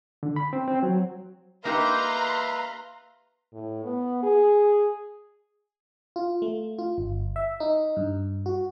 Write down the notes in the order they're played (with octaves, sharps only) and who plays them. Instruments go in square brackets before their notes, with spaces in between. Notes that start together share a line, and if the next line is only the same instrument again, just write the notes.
[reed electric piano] D3
B5
C4
C4
F#3
[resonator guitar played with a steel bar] A#3 D#4 G4 [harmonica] B4 E5 F5 [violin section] A#5 C6
[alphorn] A2
B3
G#4
[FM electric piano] F4
A3
F4
G1
E5
D#4
G2
F#4